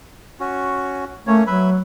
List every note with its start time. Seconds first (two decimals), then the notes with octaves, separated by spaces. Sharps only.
0.40 C#4 F#4
1.27 A3 A#3 C#4 C#5
1.47 F#3 B4 E5 B5